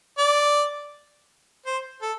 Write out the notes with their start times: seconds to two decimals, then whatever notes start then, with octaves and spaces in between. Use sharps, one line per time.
0.18 D5
1.66 C5
2.02 A4